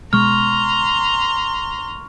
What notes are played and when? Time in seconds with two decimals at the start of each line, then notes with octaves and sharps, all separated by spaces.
0.13 B2 G#3 A#5 C6 C#6 F6